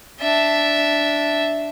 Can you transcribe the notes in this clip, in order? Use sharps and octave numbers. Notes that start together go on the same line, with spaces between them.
D4 E5